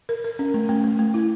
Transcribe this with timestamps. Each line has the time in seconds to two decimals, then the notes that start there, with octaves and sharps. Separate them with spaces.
0.09 A#4
0.24 A#4
0.39 C#4
0.54 A3
0.69 A3
0.84 A3
0.99 A3
1.14 E4